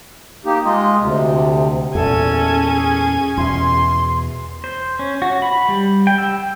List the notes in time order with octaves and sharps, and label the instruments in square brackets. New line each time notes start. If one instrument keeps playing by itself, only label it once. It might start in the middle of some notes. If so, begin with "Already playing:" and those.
[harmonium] A#3 D#4 G4
G#3 F4 D#5
D2 C3
[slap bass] E2 A#2 [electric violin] C#4 G#5 [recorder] A4
[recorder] G#4
[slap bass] E2 B2 [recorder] C6
[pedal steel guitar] C5
C#4
F#4
B5
G3
G5
E6